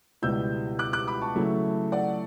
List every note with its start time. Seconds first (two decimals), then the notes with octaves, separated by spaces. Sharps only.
0.22 C#2 B2 G3 B3 E4 E6 G6
0.79 D6 F#6
0.93 D6 F#6
1.07 B5 D6
1.21 A5 C#6
1.35 C#3 F#3 A3 E4
1.92 D5 F#5